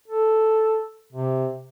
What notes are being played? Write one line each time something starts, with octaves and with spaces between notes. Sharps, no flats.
A4
C3